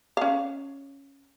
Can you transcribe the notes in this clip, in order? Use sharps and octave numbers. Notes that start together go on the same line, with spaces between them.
C#4 F5